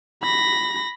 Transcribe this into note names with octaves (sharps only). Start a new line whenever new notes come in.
B5 A#6